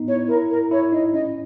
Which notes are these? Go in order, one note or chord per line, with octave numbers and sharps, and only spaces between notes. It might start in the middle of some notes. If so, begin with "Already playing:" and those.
Already playing: B3 D#4
E4 C#5
E4 A#4
A#4
E4 C#5
D#4 D#5
C#4 D#5